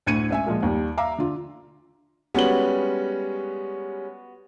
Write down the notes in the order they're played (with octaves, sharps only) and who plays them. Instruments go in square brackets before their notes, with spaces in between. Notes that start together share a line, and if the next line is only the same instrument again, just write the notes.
[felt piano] D2 A2 G#6 C#7 D#7
C#2 E5 G#5
A#2 F3 G#3
D#2 G3
E5 F5 A#5 D6
D3 F4
[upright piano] G3 G#3 C#4 [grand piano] B3 F#4 F#7